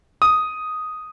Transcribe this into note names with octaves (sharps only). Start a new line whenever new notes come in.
D#6